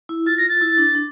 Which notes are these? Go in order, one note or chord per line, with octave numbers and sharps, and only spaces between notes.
E4
F4 A6
A#6
A6
E4
D4
D4